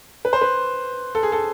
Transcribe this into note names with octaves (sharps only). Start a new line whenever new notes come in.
B4
C5
B4
A4
G#4
A4